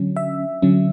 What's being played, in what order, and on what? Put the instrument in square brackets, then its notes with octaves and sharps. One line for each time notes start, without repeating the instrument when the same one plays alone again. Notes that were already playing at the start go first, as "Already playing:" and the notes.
Already playing: [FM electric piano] D3 F#3 C#4
E5
D3 F#3 C#4